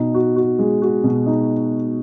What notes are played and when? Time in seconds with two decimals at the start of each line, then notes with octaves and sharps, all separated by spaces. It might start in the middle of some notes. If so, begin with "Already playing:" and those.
Already playing: B2 D#4
0.14 F#4
0.36 F#4
0.59 G#3
0.82 F#4
1.04 B2
1.26 D#4